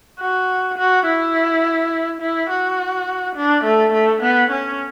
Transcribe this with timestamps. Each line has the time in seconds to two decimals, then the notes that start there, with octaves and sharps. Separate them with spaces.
0.20 F#4
0.78 F#4
1.06 E4
2.21 E4
2.50 F#4
3.36 D4
3.64 A3
3.93 A3
4.22 B3
4.51 C#4